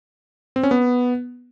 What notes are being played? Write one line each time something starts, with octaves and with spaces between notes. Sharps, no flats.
C4
C#4
B3